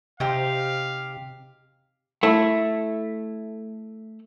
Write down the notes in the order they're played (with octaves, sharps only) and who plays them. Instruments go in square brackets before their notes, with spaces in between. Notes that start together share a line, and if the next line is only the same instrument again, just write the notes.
[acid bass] C3 [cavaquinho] D#4 G4 C5 [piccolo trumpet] F5
[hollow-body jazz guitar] A3 E4